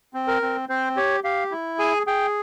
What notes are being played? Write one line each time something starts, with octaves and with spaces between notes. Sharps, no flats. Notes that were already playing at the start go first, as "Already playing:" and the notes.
C4
A#4
C4
C4 C5
G4 C#5
G4 F5
E4
G#4 G#5
G#4 G5